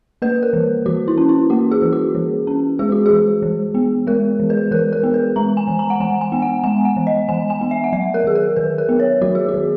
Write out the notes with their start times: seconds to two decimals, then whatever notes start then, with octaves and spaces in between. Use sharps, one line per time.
0.22 A#3 B4
0.43 A#4
0.53 E3
0.86 E3 F#4
1.08 E4
1.17 C#4
1.29 E4
1.50 A#3 F#4
1.71 G#4
1.82 E3
1.93 F#4
2.15 E3
2.47 C#4
2.79 G#3 G#4
2.92 F#4
3.06 E3 G#4
3.42 E3
3.74 B3
4.07 G#3 A#4
4.39 E3
4.50 B4
4.71 E3 A#4
4.93 A#4
5.03 B3
5.14 B4
5.36 G#3 A#5
5.57 G#5
5.67 E3
5.79 A#5
5.90 F#5
6.00 E3 G#5
6.21 G#5
6.32 B3
6.42 F#5
6.64 G#3 G#5
6.85 F#5
6.96 E3
7.07 D#5
7.29 E3 G#5
7.50 G#5
7.61 B3
7.71 E5
7.84 F#5
7.93 F#3 E5
8.14 A#4
8.24 D#3 G#4
8.35 A#4
8.56 D#3 B4
8.78 A#4
8.89 B3
9.00 C#5
9.21 F#3 F#4
9.35 G#4
9.48 F#4
9.54 D#3